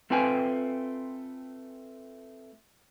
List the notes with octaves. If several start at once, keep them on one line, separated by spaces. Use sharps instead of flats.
A3 C4 F4 B4 G5 G#5